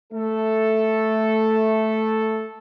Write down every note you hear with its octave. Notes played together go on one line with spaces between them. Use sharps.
A3 A4